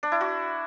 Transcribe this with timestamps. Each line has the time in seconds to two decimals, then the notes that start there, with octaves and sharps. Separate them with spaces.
0.03 D4
0.12 E4
0.21 F#4